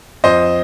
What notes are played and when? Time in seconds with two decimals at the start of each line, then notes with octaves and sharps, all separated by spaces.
0.24 F2 C5 D#5